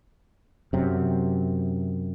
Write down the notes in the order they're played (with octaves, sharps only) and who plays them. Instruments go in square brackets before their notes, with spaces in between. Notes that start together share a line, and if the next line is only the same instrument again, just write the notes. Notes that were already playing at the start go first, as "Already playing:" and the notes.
[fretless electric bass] F#2 C3